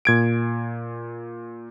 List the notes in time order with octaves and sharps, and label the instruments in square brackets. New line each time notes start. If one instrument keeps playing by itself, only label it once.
[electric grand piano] A#2 G#6 D7